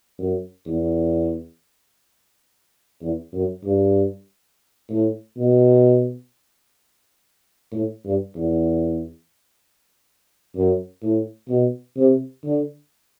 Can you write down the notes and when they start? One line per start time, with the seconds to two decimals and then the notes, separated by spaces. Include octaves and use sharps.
0.19 F#2
0.66 E2
3.02 E2
3.33 F#2
3.64 G2
4.90 A2
5.37 B2
7.72 A2
8.05 G2
8.36 E2
10.56 F#2
11.03 A2
11.49 B2
11.97 C3
12.44 D3